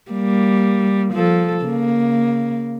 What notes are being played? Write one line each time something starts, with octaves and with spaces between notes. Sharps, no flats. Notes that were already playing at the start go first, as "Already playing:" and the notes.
G3 A#3
F3 A4
C#3 A#3